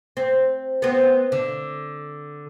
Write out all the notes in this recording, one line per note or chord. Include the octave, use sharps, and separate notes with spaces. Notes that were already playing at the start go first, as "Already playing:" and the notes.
C4
B3 C4
D3